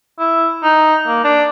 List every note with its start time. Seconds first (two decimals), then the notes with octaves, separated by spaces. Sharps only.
0.19 E4
0.64 D#4
1.07 A#3
1.24 D4